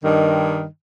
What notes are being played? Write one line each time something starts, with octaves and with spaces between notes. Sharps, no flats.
G2 D#3